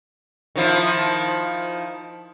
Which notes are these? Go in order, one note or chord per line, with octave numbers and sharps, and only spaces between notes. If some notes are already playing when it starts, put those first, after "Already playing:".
D#3 F3 E4